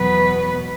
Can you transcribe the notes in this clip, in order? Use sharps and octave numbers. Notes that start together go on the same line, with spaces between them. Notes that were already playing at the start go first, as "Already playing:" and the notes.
Already playing: E2 B2 F#3 B3 B4